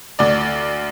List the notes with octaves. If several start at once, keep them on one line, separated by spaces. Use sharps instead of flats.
D2 D5